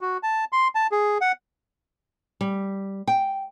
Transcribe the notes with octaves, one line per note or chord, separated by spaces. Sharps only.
F#4
A5
C6
A5
G#4
F#5
G3
G5